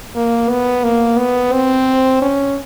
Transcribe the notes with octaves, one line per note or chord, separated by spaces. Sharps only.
A#3
B3
A#3
B3
C4
C#4